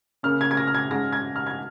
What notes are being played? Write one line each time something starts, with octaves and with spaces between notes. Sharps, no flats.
C#3 A#3 C#4 F6
G#6
G#6
A#6
F6
G#6
G#2 G#3 C#4 A#6
G#6
F6
G#6